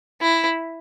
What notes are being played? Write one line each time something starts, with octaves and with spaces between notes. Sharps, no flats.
E4